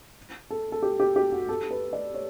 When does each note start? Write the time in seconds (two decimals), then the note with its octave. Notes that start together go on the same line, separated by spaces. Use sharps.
0.51 A4
0.72 A4
0.82 G4
1.00 G4
1.16 G4
1.32 F#4
1.49 A4
1.71 B4
1.93 D5
2.14 C#5